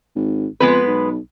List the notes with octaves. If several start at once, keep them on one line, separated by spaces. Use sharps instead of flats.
G#1
F2 G#3 B3 B4
B1